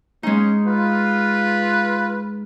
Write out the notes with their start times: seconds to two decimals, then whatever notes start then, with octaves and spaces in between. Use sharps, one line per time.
0.23 G#3 C#4 D#4
0.66 F4 B4